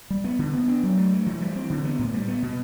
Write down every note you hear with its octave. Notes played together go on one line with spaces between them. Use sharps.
G3
B3
D3
B3
D4
F#3
A3
G2
E3
G3
C4
D3
B3
A2
G3
B3
B2